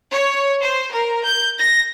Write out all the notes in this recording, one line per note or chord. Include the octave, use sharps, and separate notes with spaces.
C#5
C5
A#4
G6
A#6